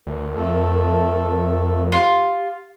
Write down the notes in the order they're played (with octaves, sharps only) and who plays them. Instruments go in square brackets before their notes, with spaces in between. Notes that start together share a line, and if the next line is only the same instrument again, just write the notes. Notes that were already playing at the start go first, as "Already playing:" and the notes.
[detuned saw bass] D2 [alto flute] A#4
[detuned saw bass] F2 [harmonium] A3 A4
[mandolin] F4 [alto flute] G4